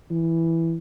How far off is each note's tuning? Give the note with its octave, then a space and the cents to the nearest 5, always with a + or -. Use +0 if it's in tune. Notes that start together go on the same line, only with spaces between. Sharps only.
E3 +0